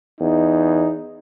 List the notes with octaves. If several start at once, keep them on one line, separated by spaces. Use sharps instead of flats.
E2 D#4